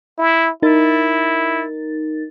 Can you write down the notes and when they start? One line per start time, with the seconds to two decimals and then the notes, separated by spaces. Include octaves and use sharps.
0.18 E4
0.62 D#4 E4 A#4 A6